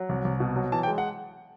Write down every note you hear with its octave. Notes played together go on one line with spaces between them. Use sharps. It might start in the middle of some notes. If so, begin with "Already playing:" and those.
Already playing: F#3
C2
C2
B2
F#3
E3 A5
G5
G#3
F#5